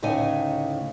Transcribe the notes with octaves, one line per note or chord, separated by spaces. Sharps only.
D2 A2 C#3 D#4 C#5 G#5